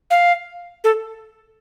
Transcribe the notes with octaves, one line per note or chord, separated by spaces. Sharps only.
F5
A4